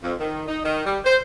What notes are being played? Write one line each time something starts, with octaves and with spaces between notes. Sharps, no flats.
F2
D#3
D#4
D#3
G3
C5